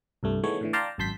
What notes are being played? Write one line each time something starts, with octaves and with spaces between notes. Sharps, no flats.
C2 G2 A3
D#3 E3 G#3 A3 B3 C#5
A2 D3 E3
D5 F5 G5 A5 A#5 C6
G#1 F#2 A5 C6 G6 B6